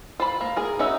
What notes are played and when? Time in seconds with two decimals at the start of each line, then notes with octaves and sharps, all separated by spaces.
0.20 F4 C5 B5
0.41 A#3
0.57 G#4 A#4
0.79 C#4 D#4 F#4 E5